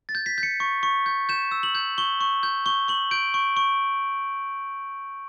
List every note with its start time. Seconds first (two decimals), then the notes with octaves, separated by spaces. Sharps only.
0.09 A6
0.15 G6
0.26 B6
0.38 G6
0.43 C#7
0.60 C#6
0.83 C#6
1.06 G6
1.29 G6 E7
1.51 E6
1.63 F#7
1.75 G6
1.98 C#6 G7
2.21 C#6
2.43 G6
2.66 C#6 G7
2.88 C#6 F#7
3.11 G6 D7
3.34 C#6
3.57 C#6